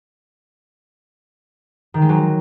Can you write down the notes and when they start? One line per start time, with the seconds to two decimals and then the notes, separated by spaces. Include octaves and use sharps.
1.94 D#3
2.02 G#3
2.09 F#3